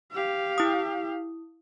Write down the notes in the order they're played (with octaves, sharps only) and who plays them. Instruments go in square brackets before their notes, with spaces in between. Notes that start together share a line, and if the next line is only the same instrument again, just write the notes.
[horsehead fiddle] G4 F5
[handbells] E4 D#6